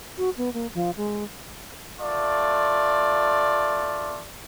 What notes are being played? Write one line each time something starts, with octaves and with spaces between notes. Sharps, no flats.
F#4
B3
A#3
F3
G#3
A3 F4 D5